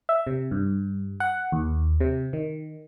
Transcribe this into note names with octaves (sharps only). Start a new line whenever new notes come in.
E5
C3
G2
F#5
D#2
C3
D#3